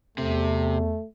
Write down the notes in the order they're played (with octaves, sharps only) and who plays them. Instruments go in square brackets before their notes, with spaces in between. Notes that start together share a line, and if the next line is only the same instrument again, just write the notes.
[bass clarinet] E2 [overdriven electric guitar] C3 [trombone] A3